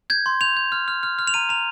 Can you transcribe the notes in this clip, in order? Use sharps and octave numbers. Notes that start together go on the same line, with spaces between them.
G6 G#6
C6
G6 F7
G6
F6
F6
F6
F6
F7
A#5 D#7
A#5 F7